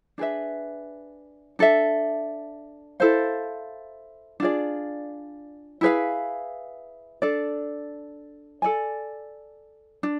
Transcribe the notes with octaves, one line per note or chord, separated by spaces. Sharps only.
D4 G#4 B4 E5
D4 A4 E5
E4 A4 C5 F5
D4 F4 G#4 D5
E4 G#4 B4 F5
D4 A4 D5
A4 D5 G#5
D4